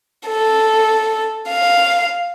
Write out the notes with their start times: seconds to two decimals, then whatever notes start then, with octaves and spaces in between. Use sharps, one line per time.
0.28 A4
1.49 F5